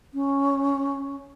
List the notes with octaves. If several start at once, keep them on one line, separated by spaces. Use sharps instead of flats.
C#4